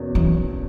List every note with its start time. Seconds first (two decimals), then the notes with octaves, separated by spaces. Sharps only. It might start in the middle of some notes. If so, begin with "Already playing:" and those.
Already playing: E2 B2 A#3 C#4
0.15 E3